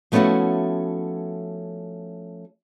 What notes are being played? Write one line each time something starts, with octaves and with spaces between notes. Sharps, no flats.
F3 A3 B3 C#4 E4 F#4